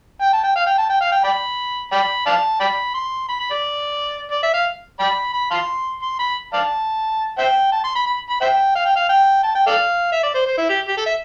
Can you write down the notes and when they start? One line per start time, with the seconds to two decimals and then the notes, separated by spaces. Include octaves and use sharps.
0.21 G5
0.33 A5
0.44 G5
0.55 F5
0.67 G5
0.78 A5
0.90 G5
1.01 F5
1.12 G5
1.24 D5 G5 B5
1.92 D5 G5 B5
2.26 D5 F5 A5
2.60 D5 G5 B5
2.94 C6
3.29 B5
3.40 B5
3.51 D5
4.31 D5
4.43 E5
4.54 F5
5.00 D5 G5 B5
5.33 B5
5.51 F5 A5 C6
6.02 C6
6.19 B5
6.53 D5 F5 A5
7.38 C5 E5 G5
7.72 A5
7.84 C6
7.96 B5
8.07 B5
8.30 B5
8.41 C5 E5 G5
8.76 F5
8.86 G5
8.96 F5
9.10 G5
9.44 A5
9.55 G5
9.67 A4 D5 F5
10.12 E5
10.23 D5
10.35 C5
10.46 C5
10.58 E4
10.69 G4
10.89 G4
10.98 A4
11.06 E5